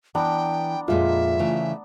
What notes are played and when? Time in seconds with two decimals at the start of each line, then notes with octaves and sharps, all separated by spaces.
0.15 E3 B3 D4 G5 A#5
0.88 F2 A#2 G#3 F4 E5
1.39 C#3 E3 A3